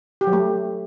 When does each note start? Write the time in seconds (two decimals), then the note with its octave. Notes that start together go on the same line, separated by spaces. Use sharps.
0.21 G4
0.27 F#3
0.33 A3